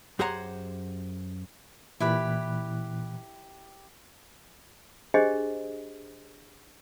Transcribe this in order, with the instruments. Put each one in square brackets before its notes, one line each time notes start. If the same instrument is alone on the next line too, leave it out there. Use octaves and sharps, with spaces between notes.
[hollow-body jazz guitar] F#2 G4 G#4 C5 F#5 A#5
[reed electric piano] A#2 E3 F#6 [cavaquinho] E4 G4 B5
[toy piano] D4 G4 G#4 C5 D#5